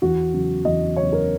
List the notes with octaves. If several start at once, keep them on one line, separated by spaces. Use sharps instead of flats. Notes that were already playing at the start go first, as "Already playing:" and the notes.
E2 F#4
C#3 F#3
E2 D#5
C#3 F#3 C#5
A#4